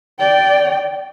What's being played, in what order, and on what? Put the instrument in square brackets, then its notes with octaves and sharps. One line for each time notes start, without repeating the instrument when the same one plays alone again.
[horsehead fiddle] D5 G5